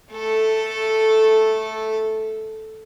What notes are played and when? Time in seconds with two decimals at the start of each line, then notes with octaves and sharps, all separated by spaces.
0.12 A3 A4